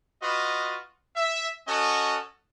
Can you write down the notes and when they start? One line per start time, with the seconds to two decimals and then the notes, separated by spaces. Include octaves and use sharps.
0.23 F4 F#4 B4 D#5
1.16 E5
1.68 C#4 F#4 A4 D#5